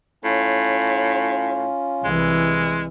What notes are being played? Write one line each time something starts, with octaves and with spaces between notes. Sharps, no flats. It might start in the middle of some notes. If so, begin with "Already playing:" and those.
A2 C#4 F4
C2 E3 G#3